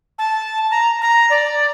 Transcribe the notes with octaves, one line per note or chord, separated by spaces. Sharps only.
A5
A#5
A#5
D5